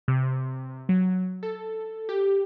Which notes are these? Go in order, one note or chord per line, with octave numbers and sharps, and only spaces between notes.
C3
F#3
A4
G4